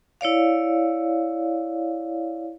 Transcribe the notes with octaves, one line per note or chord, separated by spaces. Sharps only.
E4 C#5 D5 F5